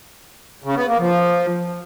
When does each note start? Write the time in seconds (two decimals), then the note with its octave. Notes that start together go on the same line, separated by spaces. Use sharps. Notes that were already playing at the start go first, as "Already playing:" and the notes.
0.64 C#3
0.76 B3
0.87 A#3
0.99 F3